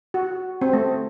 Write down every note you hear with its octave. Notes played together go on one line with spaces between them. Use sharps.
F#4
C4
A3